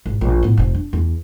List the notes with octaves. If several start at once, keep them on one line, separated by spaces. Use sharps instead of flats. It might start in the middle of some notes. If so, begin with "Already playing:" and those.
G#1
A#1
A2 B3
F1 C3
D4
E2